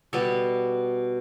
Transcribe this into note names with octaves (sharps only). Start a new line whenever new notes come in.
B2 G3 B3 A4